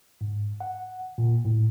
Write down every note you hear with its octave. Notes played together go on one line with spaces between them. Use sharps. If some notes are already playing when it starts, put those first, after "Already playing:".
G#2
F#5
A#2
A2